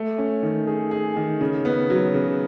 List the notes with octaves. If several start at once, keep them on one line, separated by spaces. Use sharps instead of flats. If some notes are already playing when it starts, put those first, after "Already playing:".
Already playing: A3
C#4
D#3
G#4
G#4
D#3
C#3
B3
F#3
C#3